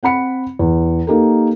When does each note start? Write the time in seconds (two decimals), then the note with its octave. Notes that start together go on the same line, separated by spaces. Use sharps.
0.03 C4 F#5 B5 C#7
0.59 E2
1.07 A#3 D#4 G4 A4 A#4